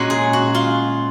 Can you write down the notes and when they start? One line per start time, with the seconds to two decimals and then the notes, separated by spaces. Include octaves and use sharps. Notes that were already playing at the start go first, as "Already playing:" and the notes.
Already playing: A#2 G#3 C#4 F#4
0.10 G#4
0.33 F#4
0.55 F4